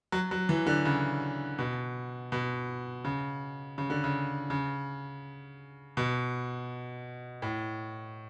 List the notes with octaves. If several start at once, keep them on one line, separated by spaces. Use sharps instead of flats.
F#3
F#3
E3
D3
C#3
B2
B2
C#3
C#3
D3
C#3
C#3
B2
A2